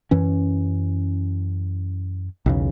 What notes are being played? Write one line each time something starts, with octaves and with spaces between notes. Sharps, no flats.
F#2 E3 C#4
B1 E2 C#3